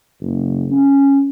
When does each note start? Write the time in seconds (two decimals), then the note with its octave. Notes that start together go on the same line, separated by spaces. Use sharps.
0.21 F#1
0.71 C#4